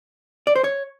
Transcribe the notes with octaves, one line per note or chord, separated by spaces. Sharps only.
D5
C5
C#5